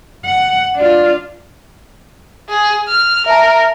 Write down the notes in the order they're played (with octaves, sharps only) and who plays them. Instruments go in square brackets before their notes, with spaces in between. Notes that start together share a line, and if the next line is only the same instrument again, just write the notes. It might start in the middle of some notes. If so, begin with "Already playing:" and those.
[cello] F#5
D4 F4
[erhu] G#4
F6
[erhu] A#4 [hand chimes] E5 A5